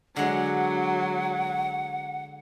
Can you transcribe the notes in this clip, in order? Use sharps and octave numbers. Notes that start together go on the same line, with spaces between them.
D3 F#3 G#3 F#5